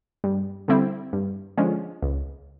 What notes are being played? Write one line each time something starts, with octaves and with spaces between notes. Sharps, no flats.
G2
D3 G3 C4 E4
G2
D3 F3 G#3 C#4
C#2